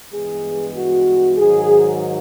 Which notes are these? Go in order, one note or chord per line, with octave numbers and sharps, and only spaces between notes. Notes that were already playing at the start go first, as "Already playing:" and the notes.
G2 E3 G#3 B3 G#4
F#4
G#2 D#3 F#3 G#4